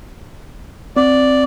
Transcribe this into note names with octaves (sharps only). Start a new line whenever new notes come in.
C4 D5